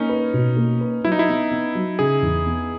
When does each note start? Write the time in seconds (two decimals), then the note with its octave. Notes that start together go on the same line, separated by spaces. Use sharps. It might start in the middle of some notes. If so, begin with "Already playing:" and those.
Already playing: A#3 C#4 D#4
0.09 B4
0.34 B2
0.57 A#3
0.81 B4
1.04 F#3 E4
1.12 D#4
1.19 E4
1.29 B3
1.51 B3
1.75 F#3
1.99 C#3 G#4
2.22 E2
2.46 B3